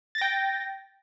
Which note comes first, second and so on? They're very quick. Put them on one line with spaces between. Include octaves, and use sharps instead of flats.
A6 A#6 G5